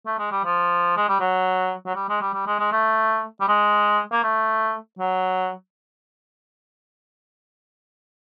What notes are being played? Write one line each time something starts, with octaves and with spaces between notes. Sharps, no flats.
A3
G#3
G3
F3
G#3
G3
F#3
F#3
G3
G#3
G3
G3
G#3
G#3
A3
G3
G#3
A#3
A3
F#3